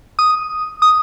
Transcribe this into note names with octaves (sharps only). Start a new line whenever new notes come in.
D#6
D#6